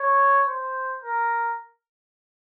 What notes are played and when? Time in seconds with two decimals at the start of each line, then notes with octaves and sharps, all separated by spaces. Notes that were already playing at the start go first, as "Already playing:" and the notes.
Already playing: C#5
0.48 C5
1.04 A#4